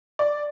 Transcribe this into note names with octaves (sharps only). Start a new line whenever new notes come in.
D5